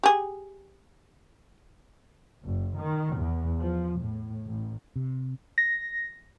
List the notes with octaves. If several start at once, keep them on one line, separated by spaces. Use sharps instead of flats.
G4 G#4
F#1
D#3
E2
F3
A2
A1
C3
A#6